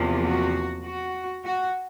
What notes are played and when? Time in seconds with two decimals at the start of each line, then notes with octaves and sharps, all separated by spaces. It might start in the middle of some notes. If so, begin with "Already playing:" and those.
Already playing: E2 C3 F3 A#3
0.24 F#4
0.84 F#4
1.44 F#4